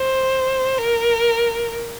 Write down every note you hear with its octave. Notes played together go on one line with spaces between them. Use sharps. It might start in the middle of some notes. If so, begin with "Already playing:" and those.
Already playing: C5
A#4